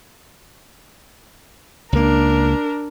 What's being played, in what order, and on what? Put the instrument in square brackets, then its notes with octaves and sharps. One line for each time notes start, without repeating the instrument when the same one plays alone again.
[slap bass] C#2 A#3 [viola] D4 A#4